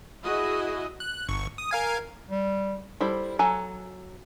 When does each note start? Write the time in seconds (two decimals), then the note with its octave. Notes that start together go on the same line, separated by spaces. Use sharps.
0.23 E4 F#4 G#4 D#5
1.00 F#6
1.29 G1 C#6
1.58 D#6
1.71 A#4 F5 G#5
2.29 G3
3.01 G3 E4 A4 C5
3.39 F#3 A4 G#5 A#5